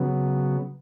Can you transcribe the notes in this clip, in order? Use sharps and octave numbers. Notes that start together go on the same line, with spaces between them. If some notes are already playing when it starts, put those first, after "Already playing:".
Already playing: C#3 F#3 B3